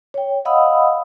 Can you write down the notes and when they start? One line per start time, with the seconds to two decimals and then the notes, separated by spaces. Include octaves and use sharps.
0.14 C#5 G5
0.45 D#5 F5 F#5 B5 D#6 E6